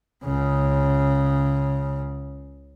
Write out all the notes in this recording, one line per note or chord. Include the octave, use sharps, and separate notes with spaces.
C#2 C#3